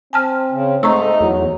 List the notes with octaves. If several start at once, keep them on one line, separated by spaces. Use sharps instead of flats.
C4 G#5 A5 F6
C#3
G#2 A3 D#4 A#5 C#6 E6
E2 F#3